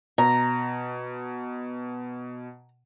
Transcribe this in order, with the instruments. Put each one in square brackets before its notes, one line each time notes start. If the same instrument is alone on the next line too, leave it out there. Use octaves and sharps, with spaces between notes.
[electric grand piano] B2 [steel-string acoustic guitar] A#5